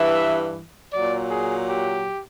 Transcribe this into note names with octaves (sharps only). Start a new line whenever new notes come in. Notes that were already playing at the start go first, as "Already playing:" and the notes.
Already playing: G2 E3 E5
A#2 F#3 D5
G#4
G4